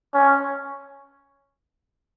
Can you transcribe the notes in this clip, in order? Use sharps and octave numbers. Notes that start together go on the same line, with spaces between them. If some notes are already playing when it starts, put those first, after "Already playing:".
C#4